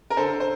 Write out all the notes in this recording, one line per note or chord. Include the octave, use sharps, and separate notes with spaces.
A#4
D3 A4 C5
C5